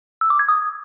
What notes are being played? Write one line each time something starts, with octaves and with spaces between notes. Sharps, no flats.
E6
D6
G#6
D#6